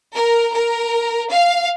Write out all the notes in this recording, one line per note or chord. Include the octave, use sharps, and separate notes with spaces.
A#4
A#4
F5